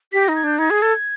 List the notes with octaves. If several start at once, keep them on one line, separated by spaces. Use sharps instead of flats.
G4 B6
D#4 A#6
G#6
D4 G6
D#4 G#6
G#4
A4